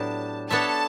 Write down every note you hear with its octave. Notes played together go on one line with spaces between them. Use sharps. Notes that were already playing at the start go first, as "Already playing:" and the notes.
Already playing: A2 F#3 B3 D4 G4 A5
B3 D4 A4 C#5 E5 A5